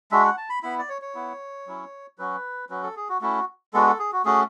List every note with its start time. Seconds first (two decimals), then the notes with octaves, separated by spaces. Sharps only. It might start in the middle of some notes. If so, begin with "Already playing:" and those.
0.12 G#3 D4 F#4 E5
0.24 F#5
0.37 A5
0.50 B5
0.63 B3 E4 B5
0.79 D5
0.89 C#5
1.02 C#5
1.15 B3 E4
1.67 F#3 C#4 E4
2.18 F#3 C#4 F#4 B4
2.70 F#3 C#4 F#4 B4
2.83 A4
2.96 G#4
3.09 F#4
3.21 A3 C#4 E4 F#4
3.74 G#3 B3 D4 F#4 A4
3.86 A4
3.99 G#4
4.13 F#4
4.25 A3 C#4 F#4 G#4